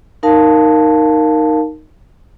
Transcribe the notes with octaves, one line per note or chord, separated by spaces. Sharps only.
D#4 A#4 F5 A5